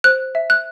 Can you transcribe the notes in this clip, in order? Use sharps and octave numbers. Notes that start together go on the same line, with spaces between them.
C5 F#6
E5
F#6